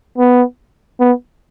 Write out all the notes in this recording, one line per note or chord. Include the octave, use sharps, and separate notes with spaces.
B3
B3